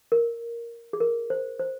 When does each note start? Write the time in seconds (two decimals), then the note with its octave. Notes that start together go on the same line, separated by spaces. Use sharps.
0.12 A#4
0.93 G#4
1.00 A#4
1.30 C5
1.59 C5